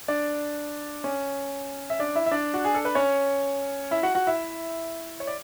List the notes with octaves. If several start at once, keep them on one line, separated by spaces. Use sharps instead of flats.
D4 D5
C#4 C#5
E5
D4 D5
E4 E5
E5
D4 D5
F#4
G#4
A4
B4
C#4 C#5
E4 E5
F#4 F#5
F#4 F#5
E4 E5
C#5
D5